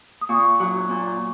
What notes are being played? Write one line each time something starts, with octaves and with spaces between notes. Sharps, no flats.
D#6
A#2 C#6
F#3
A#2